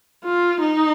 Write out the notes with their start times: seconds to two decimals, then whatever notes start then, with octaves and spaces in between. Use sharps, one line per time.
0.24 F4
0.61 D#4